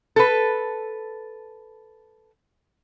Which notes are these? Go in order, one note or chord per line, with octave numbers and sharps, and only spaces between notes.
A4 B4